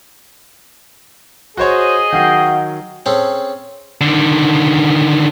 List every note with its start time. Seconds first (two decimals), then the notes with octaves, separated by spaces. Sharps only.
1.57 F#4 G#4 C5 C#5 D#5
2.13 D#3 F#3 F#4 F5 G5
3.06 C4 C#4 G#4 A4
4.01 D3 D#3